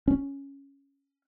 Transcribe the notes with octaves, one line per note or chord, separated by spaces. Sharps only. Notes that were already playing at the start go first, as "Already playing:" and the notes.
C#4